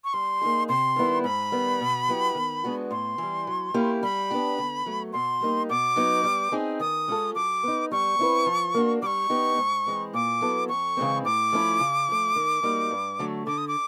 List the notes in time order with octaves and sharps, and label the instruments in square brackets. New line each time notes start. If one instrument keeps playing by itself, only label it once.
[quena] C#6
[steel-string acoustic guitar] G3 [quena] C6
[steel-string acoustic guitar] A#3 D#4 G#4
[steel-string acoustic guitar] C3 [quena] C6
[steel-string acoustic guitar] D#3 G3 B3 E4
[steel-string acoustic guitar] G#2 [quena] B5
[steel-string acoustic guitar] D#3 G3 B3
B2
F#3 B3 E4 G4
D#3
G#3 B3 D4 F#4
[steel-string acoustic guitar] A2 [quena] C6
[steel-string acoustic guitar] E3 G3
F#3
A#3 C#4 E4 G4
[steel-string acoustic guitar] G3 [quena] B5
[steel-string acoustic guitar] B3 D4 G4
D3
F#3 A3
[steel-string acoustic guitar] B2 [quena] C6
[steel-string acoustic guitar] G3 A#3 D#4 G4
[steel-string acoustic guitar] B2 [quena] D6
[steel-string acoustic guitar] F#3 B3 D#4
G3
C4 D#4 G#4
[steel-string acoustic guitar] D#3 [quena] D#6
[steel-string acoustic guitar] G#3 C#4 F4 A4
[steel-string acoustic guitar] F#3 [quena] D6
[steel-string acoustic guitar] B3 D#4
[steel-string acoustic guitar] G3 [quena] C#6
[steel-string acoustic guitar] C4 E4 G4 B4
F3
A#3 D4 F#4
[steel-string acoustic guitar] G3 [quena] C#6 D6
[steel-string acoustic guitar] B3 D#4 G4
G#2
E3 G#3 C4
[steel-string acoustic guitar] A#2 [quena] D6
[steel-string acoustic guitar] F#3 B3 E4 A4
[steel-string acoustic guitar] F2 [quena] C#6
[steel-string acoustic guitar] C#3 E3 G#3 C4
[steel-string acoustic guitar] A2 [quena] D6
[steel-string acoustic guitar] F3 A3 C#4 E4
C#3
F3 A3
D#3
G3 A#3 D#4 F#4
G2
D3 F#3 A3
[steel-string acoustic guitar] D3 [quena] D6
[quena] D#6
D6